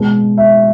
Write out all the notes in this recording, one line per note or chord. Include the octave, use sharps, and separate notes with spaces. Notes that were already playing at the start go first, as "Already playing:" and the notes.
Already playing: B2 G#3
E5